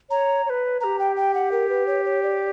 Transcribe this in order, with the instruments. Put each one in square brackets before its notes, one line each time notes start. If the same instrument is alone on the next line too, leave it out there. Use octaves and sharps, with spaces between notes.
[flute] C#5 [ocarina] A#5
[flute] C#5
B4
[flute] B4 [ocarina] A#5
[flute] G4
[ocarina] G5
G5
F#5
A#4
B4
C#5
C#5
D5